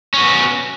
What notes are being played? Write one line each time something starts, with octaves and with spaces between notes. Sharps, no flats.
B3 C#4 F#4